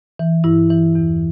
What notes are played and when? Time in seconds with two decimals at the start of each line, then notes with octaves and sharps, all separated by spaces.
0.19 E3
0.44 G2 E4
0.70 E3
0.95 E2